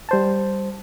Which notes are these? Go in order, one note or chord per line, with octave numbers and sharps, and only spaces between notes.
G3 C5 A5